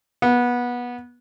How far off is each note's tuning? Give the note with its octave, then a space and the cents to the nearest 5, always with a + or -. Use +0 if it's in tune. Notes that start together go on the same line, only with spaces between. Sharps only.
B3 -20